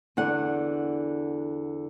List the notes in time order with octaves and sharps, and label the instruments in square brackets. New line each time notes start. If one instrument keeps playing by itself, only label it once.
[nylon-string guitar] E2 D3 F#5